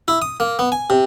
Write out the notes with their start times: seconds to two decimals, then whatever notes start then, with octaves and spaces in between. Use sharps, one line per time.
0.08 E4
0.22 D#6
0.40 A#3
0.59 B3
0.72 G#5
0.90 C3